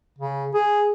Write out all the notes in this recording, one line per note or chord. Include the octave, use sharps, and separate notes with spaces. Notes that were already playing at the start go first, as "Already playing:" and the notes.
C#3
G#4